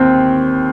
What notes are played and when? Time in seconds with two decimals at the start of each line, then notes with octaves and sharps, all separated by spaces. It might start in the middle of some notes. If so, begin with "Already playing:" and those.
Already playing: D#2 C4